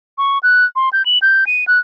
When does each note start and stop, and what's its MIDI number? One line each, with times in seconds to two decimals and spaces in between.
0.18 0.38 85
0.43 0.65 90
0.76 0.89 84
0.93 1.05 91
1.06 1.18 102
1.22 1.45 91
1.47 1.65 99
1.67 1.79 90